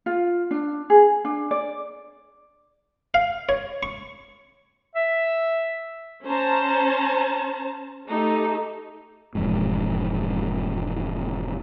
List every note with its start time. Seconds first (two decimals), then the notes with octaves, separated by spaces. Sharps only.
0.06 F4
0.51 D4
0.90 G#4
1.25 D4
1.51 D5
3.14 F5
3.49 C#5
3.83 C#6
4.95 E5
6.26 C#4 C5 A5 A#5
8.07 A3 D#4 G4 A4
9.35 E1 F2 G#2